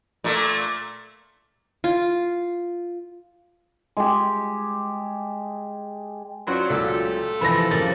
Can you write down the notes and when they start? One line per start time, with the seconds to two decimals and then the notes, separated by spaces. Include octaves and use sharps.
0.24 A#2 A3
1.84 F4
3.97 G#3 G4
6.47 F#3 C#4 F4 C5 D5
6.70 C#2 A#2 F#3 A3 F4 G4 A4
7.41 C3 E3 F3 B4 B5 A#6
7.71 C#3 F3 G3 A#3 A6